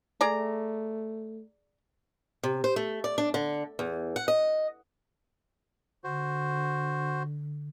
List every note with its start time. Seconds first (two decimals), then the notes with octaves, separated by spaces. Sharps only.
0.21 A3 G#4 D5 A#5
2.43 C3
2.64 C5
2.76 A3
3.04 D5
3.18 D4
3.34 D3
3.79 E2
4.16 F#5
4.28 D#5
6.04 D3 F#4 C5